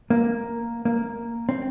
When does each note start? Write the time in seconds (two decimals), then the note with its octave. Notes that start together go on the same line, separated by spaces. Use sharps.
0.10 A#3
0.85 A#3
1.49 C4